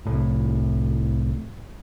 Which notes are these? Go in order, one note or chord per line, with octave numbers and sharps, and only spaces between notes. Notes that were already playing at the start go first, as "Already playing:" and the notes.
C2 A2